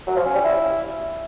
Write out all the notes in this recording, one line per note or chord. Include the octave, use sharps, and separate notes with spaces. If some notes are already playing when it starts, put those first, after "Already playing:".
F#3
F3
C#4
G3
E4